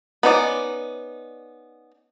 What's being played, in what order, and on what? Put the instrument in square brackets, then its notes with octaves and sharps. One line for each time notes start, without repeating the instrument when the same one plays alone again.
[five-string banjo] B3 C#4 D#4 C5 D5